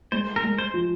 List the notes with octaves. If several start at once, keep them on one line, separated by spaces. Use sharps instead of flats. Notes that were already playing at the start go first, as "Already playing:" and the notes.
G#3 C5
A#4
G#3
C5
F3